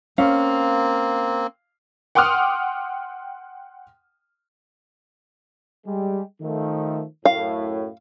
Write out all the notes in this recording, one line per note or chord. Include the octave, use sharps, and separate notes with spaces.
A#3 C4 C#4 F5
F#5 G5 C6 D6 D#6 F6
G3 G#3 G4
D#3 F3 A3
F#2 A2 F5